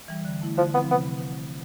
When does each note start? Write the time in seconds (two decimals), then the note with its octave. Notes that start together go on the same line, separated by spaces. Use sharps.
0.08 E3 G3
0.25 D3
0.42 A3 E4
0.57 D3 F3
0.74 F3 B3 C4 E4
0.91 C3 B3